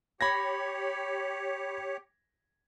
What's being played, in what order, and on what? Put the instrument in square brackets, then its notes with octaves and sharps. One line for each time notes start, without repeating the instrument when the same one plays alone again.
[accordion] G4 C#5 [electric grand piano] B5 G#6 A#6